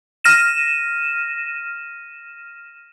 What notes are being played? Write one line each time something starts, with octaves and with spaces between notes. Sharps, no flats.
F6 A#6 D#7 E7